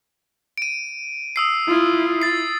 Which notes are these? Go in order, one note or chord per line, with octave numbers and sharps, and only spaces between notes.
D7 D#7
D#6 E6 C7
E4 F4
A6 C7